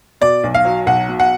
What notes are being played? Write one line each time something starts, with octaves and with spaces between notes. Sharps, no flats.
B2 D5
B1
F5
F#3
B1 F#5
B2
F#5